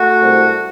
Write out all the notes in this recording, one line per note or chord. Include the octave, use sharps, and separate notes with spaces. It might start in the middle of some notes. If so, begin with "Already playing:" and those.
Already playing: A3 F#4
C2